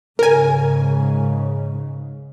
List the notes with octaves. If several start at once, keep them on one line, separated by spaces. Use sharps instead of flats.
G#2 C#3 A#4 G#5